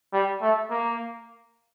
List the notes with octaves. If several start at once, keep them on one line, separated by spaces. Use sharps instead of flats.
G3
A3
A#3